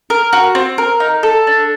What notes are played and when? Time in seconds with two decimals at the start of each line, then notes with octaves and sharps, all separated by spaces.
0.10 A#4
0.33 F#4
0.55 C4
0.78 A#4
1.00 D#4
1.23 A4
1.47 D4